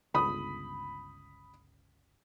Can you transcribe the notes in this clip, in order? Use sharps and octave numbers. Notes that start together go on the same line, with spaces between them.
G1 C#2 B5 D#6